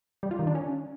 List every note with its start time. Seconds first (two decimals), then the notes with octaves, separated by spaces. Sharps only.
0.23 G3
0.31 F4
0.39 D#3
0.47 D4
0.55 C#4